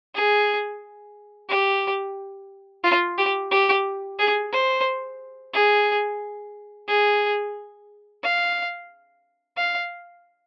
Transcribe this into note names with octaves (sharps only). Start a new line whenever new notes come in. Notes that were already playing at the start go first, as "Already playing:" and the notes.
G#4
G4
F4
G4
G4
G#4
C5
G#4
G#4
F5
F5